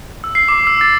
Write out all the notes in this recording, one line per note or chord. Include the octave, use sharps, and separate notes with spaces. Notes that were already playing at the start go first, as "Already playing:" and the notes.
E6
C7
D6
E6
A6